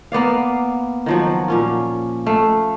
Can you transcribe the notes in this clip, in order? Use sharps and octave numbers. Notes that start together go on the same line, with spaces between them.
A#3 B3 D5 F5
D#3 F3 F#3
A#2 C#4 F4
A3 F5